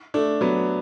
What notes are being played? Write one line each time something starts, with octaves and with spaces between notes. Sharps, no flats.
A3 D4
F#3 B3